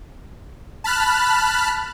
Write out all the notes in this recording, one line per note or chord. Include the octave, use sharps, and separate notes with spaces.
A5 B5 F6 F#6